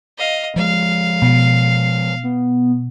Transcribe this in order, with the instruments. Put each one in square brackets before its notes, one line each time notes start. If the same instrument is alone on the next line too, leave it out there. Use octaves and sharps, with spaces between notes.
[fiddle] D#5 F5
[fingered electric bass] F3 G#3 [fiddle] F5
[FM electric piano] B2 [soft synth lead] C7
[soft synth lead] B3